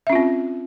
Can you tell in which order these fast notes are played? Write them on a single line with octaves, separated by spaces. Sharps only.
E5 C#4 F4 C4